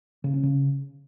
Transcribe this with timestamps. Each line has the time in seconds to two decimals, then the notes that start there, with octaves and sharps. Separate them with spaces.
0.24 C#3
0.34 C#4
0.43 C#3